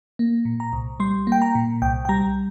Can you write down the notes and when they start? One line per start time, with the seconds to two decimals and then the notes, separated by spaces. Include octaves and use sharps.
0.19 A#3
0.45 A#2
0.60 A#5
0.73 C2
1.00 G3 C6
1.27 A#3 G5
1.42 A#5
1.55 A#2
1.82 C2 G5
2.05 G5
2.09 G3 A#5